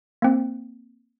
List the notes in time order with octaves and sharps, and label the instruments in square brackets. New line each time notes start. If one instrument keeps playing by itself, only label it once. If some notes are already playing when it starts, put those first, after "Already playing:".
[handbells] A#3 C4